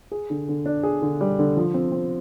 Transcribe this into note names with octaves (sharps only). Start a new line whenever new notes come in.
G#4
D3
D3
D4
G#4
D3
G3
D3
F3
C4
C4